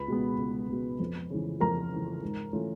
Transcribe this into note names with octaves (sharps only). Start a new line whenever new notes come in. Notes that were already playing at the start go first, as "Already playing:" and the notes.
Already playing: C#2 B4 B5
B2 G#3 B3
C#2
B2 G#3 B3
F2
C#3 E3
F2 A#4 A#5
C#3 E3
G#2
E3 A3 C#4 F4